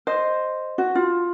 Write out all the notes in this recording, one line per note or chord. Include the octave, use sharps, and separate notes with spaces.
C5 D#5
F#4
F4